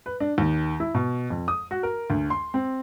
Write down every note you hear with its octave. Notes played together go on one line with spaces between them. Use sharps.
B4
D4
D#2
E4
B2
F2
D#6
F#4
A#4
D2
C6
C4